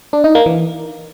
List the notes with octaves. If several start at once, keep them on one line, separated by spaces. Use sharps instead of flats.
D4
D#4
A#3
E3